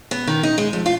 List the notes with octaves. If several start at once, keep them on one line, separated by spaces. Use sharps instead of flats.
B3
D#3
D#4
G#3
F2
F4